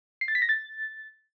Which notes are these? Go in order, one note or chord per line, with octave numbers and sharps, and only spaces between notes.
C7
A6
B6
A#6
A6